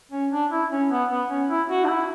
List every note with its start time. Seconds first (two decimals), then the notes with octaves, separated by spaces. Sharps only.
0.12 C#4
0.32 D4
0.51 E4
0.71 C#4
0.91 B3
1.10 B3
1.29 C#4
1.49 E4
1.69 F#4
1.84 D4
1.89 E4